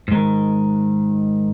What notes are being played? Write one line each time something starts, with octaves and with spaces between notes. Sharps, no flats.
G#2 D#3